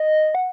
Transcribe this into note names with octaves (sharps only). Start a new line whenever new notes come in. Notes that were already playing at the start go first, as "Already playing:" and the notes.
Already playing: D#5
F#5